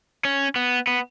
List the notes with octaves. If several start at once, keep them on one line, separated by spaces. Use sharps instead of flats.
C#4
B3
B3